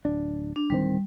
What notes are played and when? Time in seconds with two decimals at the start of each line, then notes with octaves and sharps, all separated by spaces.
0.05 D1 D4
0.56 D4
0.70 D1 D#3 G3 C4